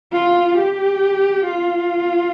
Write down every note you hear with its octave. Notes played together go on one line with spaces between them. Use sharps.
F4
G4
F4